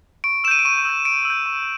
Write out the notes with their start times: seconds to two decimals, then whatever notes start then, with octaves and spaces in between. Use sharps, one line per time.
0.24 C#6 D7
0.44 E6 E7
0.48 G6 D#7
0.59 D7
0.65 C#6 D#7
0.85 E6 G6
1.05 C#6 D7
1.25 E6 G6
1.46 C#6